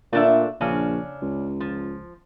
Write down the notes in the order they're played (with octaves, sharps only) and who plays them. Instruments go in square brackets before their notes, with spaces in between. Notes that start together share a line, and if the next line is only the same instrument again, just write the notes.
[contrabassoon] A#2 [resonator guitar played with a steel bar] A3 D4 E5
[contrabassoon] A#1 [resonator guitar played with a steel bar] C#3 C#4 D4
[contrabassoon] C#2
[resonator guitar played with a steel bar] F3